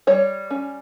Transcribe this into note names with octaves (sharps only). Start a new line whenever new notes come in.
G3 C#5
C#4